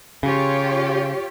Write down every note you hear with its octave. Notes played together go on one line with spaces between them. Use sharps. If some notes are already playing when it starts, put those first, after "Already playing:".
C#3 F4 G4 C#5